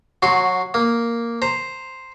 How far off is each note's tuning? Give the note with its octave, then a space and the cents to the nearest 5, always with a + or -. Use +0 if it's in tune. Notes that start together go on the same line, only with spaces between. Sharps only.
F#3 -20 F#4 +0 C6 +0
A#3 +0 D#6 +0
C5 +0 A#5 -10